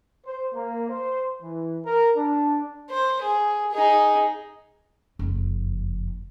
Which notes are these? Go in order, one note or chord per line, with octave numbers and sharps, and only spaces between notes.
C5
A#3
C5
E3
A#4
D4
C5
G#4
D#4 G#4
F#1 F2